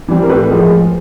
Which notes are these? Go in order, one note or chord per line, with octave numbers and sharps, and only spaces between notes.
E3 G3 C4
A#4
A2 B4
F3 G#3 A#4